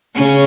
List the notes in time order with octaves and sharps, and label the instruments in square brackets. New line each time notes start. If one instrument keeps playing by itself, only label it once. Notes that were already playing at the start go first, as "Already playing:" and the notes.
[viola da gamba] C#3 C#4